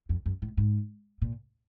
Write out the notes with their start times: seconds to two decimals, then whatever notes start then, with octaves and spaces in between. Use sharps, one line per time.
0.09 F2
0.26 F#2
0.42 A2
0.57 G#2
1.22 A#2